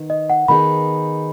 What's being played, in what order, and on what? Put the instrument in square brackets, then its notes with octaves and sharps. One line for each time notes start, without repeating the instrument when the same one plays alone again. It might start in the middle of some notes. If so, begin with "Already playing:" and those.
Already playing: [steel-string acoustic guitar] D#3 B3 D#4
[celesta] D#5
F#5
[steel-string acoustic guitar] D#3 B3 D#4 G#4 [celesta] B5